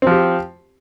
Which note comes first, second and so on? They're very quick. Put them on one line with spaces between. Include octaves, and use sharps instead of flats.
C4 F3 G4